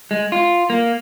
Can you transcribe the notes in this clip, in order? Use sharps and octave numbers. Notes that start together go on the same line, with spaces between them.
G#3
F4
A#3